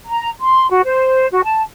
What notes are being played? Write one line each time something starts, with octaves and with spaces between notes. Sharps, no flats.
A#5
C6
F#4
C5
F#4
A5